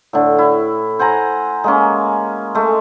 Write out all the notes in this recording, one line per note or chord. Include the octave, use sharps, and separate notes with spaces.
A2 D3
E4
C5 F#5 G#5 A#5
G#3 A#3 C#4
G#3 A3